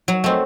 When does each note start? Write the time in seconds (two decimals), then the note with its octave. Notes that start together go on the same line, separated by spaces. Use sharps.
0.08 F#3
0.24 A3 C4